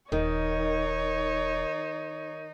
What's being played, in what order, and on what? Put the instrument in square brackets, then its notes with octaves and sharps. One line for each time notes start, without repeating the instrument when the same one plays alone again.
[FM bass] D#1 [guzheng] D#3 [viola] D#4 [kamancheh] C#5